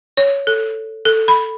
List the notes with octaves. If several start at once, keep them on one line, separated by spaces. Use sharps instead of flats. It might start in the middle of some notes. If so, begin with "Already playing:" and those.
C#5
A4
A4
B5